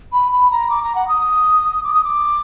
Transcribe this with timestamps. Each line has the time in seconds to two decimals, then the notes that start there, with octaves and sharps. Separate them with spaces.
0.12 B5
0.31 B5
0.51 A#5
0.69 D6
0.82 A#5
0.95 F#5
1.07 D#6
1.83 D6
1.93 D#6
2.04 D6